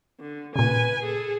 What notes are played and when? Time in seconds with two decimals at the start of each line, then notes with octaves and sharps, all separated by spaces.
0.20 D3
0.56 A#2 C#3 B4 G#5
1.02 G#4 A4